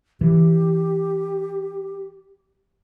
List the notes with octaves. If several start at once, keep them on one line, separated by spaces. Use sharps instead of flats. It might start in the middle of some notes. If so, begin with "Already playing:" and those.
E3 G4